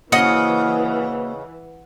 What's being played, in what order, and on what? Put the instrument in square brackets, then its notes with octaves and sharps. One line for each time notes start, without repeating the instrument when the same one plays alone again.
[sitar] C#3 D#5 [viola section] E3 [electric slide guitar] A#3 F#4 C5 [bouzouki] F#5